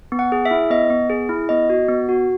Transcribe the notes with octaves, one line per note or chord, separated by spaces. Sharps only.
B3
F#5
G#4
E5
E4
B3 D#5
B3
G#4
E4
B3 D#5
F#4
B3
F#4